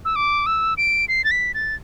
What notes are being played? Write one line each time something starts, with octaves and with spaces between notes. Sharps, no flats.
E6
D6
E6
D7
C7
A6
B6
A6